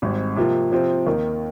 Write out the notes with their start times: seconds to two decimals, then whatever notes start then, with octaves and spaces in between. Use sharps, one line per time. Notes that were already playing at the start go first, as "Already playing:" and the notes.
0.02 G#1 G#2 G3 C4
0.36 C3 F3 A#3 F4
0.72 C3 F3 C4
1.06 D#2 D#3 A#3